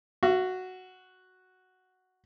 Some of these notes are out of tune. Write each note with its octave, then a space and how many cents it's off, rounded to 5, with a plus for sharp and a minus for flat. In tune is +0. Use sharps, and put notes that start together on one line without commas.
F#4 +0 F5 -40